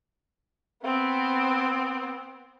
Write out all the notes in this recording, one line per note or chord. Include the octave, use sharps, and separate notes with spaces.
B3 C4